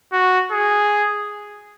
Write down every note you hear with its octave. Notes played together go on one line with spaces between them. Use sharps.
F#4
G#4